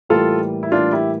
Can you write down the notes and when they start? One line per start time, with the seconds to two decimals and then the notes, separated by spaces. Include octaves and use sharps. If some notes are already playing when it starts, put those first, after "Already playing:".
0.09 A2 E3 G3 A#3 F4 A4
0.63 E4
0.72 A2 E3 G3 A#3 D4 F4
0.92 E4 G4